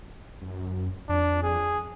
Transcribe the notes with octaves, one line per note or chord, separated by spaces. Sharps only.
F#2
F2 D4
G#4